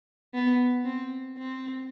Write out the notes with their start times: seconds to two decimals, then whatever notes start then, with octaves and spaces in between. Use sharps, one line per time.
0.34 B3
0.85 C4
1.38 C4